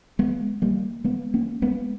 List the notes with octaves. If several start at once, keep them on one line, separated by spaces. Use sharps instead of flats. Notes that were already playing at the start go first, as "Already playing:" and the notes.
G#3 B3
G3 A#3
G#3 B3
A#3 C#4
G#3 B3